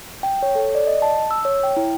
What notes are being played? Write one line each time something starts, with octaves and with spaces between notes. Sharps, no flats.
G5
C#5
A4
D5
D#5
A5
E6
C#5
G5
E4